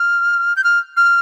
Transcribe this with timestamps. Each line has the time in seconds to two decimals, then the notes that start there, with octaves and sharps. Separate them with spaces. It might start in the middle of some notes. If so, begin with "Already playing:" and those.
Already playing: F6
0.57 G6
0.64 F6
0.97 F6